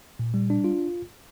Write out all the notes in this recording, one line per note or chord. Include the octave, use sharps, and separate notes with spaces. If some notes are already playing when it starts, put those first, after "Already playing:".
A#2
G3
D4
F4